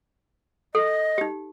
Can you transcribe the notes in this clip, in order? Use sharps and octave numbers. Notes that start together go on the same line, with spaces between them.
A4 D#5
D#4 G4